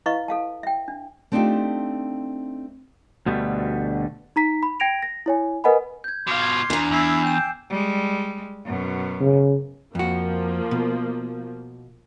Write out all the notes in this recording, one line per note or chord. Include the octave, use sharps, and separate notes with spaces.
E4 B4 D#5 F5 C#6
A4 F5 A5
E5 G5
D4
A3 C4 D4 D#4 F4 G4
D2 B2 D3 G3 A3
D#4 A#5 B6
B5
G5 G#6 A#6 D7 F7
A#6
E4 C#5 G#5
A#4 B4 D#5 F#5 G#5 B5
G6 G#6
B2 F4 C6 D6 F6
G#6
E2 D4 A#5
E2 E4 G#5 E6 C7
G5 G6 E7
G3 G#3
F#2 B2
C#3
F2 F3 A#3 F#4
B2